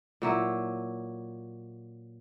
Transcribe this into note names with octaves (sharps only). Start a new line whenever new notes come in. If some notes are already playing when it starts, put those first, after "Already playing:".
A#2 F#3 E4